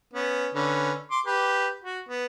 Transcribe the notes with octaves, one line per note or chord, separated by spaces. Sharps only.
B3 C#4
D3 C#4 B4
C6 D6
G4 B4
F#4
B3